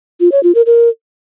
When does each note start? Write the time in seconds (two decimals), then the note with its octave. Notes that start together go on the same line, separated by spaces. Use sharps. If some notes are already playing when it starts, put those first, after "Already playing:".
0.20 F4
0.32 C#5
0.43 F4
0.55 A#4
0.66 A#4